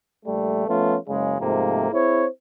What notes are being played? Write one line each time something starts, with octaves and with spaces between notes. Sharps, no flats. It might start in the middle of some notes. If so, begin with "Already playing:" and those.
A#1 G3 A3
F3 A3 B3 C#4 F4
F#1 C#3 G#3
G#2 C3 F3 A3 A#3
C4 E4 G#4 C5 C#5